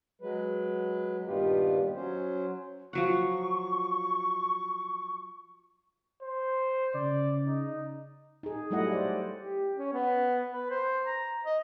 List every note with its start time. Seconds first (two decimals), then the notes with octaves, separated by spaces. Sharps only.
0.21 F#3 G#3 B4
1.27 G2 A#2 D#3 B3 F4 G4
1.96 F#3 C#4 C5
2.93 F3 F#3 F#5 C#6
6.22 C5
6.94 C#3 D5
7.46 D#4
8.43 D#4 G#4
8.71 F#3 G3 A3 E4 D#5 F#5
8.92 C5 D5
9.38 G4
9.77 C#4
9.93 B3
10.53 B4
10.70 C5
11.07 A#5
11.45 D#5